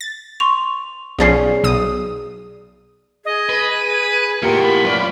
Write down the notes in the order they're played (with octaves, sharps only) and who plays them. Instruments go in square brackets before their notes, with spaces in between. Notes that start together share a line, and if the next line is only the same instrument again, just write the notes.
[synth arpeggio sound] A6
[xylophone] C6 C#6 F7
[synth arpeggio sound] B1 F3 C#4 [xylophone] G#4 D5 C7
[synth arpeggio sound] B1 D#6
[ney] G#4 [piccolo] D#5
[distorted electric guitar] B4
[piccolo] D#7
[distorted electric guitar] E2 A2 [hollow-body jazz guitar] A#3 G4 A#4 [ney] F4 [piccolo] C#7
[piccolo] B5
[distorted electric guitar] F#2 D5 [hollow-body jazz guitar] B4